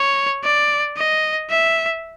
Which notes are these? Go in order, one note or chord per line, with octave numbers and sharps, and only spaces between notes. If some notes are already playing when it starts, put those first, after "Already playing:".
Already playing: C#5
D5
D#5
E5